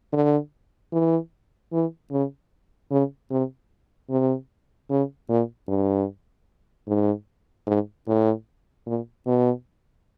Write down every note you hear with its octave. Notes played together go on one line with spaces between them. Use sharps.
D3
E3
E3
C#3
C#3
C3
C3
C#3
A#2
G2
G#2
G#2
A2
A#2
B2